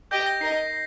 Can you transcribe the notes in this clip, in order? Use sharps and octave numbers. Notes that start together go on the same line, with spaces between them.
G4 D#5 G5 G6
A#6
D#4 A#4 D#5 C7